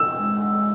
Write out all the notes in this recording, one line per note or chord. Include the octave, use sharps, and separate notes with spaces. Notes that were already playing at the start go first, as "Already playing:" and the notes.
Already playing: E6
G#3